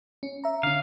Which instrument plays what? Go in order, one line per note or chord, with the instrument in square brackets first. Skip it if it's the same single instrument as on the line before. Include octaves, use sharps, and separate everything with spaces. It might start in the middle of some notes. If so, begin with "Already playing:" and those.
[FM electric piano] C#4
E5 A#5
[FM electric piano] D3 C#4 [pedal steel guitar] F5